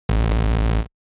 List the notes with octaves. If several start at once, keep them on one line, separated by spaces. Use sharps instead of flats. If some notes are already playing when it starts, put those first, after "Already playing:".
A1